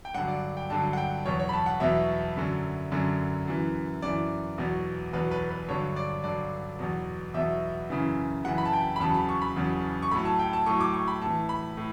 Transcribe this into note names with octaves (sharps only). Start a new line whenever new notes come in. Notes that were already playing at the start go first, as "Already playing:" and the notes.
G5
G2 D3 F#3 F#5
D5
G5
G2 D3 F#3 A5
F#5
G5
E2 B2 F#3 C#5
C#5
B5
A5
F#5
E2 B2 F#3 E5
F#2 D3 F#3
F#2 D3 F#3
F#2 E3
F#2 E3 D5
E2 B2 F#3
E2 B2 F#3 B4
B4
B4
G2 D3 F#3 C#5
D5
G2 D3 F#3 D5
E2 B2 F#3
E2 B2 F#3 E5
F#2 C#3 E3
F#2 C#3 E3 F#5
B5
A5
G5
B5
E2 C#3 F#3 A5
B5
C#6
B5
E2 C#3 F#3
C#6
A2 F#3 B5
A5
G5
A5
A2 F#3 C#6
D6
C#6
B5
A2 E3 A5
B5
A2